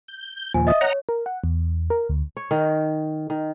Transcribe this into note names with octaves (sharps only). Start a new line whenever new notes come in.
G6
D#2 A#2 F3 G#5
D#5 E5 D#6
C#5 D#5 F#5 A#5
A#4
F#5
E2
A#4
D2
C#5
D#3
D#3